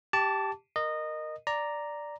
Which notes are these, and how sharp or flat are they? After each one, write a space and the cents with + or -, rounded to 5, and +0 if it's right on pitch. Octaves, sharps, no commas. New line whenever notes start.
G4 +0 A5 +0 D6 -30
A#4 +0 D#5 -15
D5 +0 A#5 +0